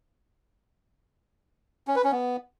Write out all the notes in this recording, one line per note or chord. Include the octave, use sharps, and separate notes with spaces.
C#4
B4
C#4
B3